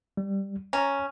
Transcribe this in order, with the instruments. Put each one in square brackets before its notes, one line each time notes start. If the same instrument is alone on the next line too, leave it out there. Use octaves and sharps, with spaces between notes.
[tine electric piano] G3
[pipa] C#4 [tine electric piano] A#5